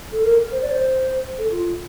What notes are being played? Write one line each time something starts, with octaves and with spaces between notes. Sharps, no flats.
A4
A#4
C5
D5
C5
A4
F4